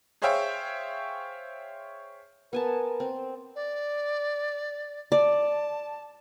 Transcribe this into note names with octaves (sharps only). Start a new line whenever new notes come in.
G#4 C5 C#5 E5 F5 G5
B3 A#4 G#5 A5
C4
D5
D5 A5